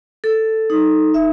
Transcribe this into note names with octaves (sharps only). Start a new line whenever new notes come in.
A4
D#4
E5